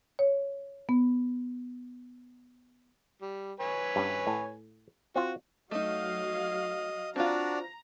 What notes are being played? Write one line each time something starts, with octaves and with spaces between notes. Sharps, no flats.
C#5
B3
G3
B4 C#5 G#5
G2 C#4
A2
C4 F4 F#4
F#3 A3 D#4 D#5 F5
C4 D4 F4 F#4 D5 A#5